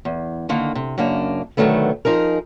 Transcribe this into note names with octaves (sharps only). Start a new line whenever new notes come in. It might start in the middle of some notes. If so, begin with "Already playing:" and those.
E2
D3 D#3 A#3
C3
F#2 C#3 A#3 D4
B2 D3 D#3 F#3 A3 B3
F3 D#4 G#4 A#4